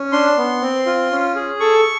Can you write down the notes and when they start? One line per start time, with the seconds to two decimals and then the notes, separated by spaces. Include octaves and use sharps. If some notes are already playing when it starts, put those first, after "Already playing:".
Already playing: C#4
0.12 D4 C6
0.38 B3
0.62 C4
0.86 F4
1.11 C#4
1.35 G#4
1.60 A4 C#6